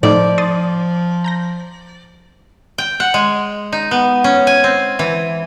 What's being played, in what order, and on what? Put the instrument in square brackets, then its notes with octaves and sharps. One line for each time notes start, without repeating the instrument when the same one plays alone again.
[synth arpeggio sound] A2 A3 D#4 [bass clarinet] F3 [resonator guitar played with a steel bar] D5
[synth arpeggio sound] C6 D#6 A6
A#5 G6 A#6
[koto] G5
F#5
G#3
D#4
B3
C#4
G#5
C4
E3